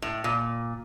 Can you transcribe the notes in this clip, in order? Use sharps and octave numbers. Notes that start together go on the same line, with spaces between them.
A2
A#2